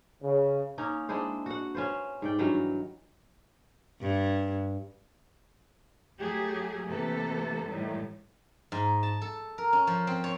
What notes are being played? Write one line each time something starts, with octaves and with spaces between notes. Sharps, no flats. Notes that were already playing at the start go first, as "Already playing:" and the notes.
C#3
A#3 C#4 D#4
G#3 D4 E4 C5
F#4 F#5
C#4 F4 B4 C5
G#2 D5 G5
G2 D#3 E3 F#3
G2
F#3 A3 G4 G#4
C3 E3 A3 A#3 A4 B4
A2 D#3 E3 G3 G#3
G#2
A5
A4
A#4
C#4
F3
C4
C#5